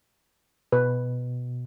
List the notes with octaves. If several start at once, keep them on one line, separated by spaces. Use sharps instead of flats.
B2 B4